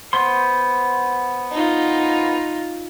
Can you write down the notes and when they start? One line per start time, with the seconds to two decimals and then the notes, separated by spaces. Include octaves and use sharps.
0.13 B3 C5 C6
1.52 D#4 F4